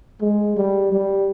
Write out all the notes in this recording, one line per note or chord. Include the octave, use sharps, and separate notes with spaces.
G#3
G3
G3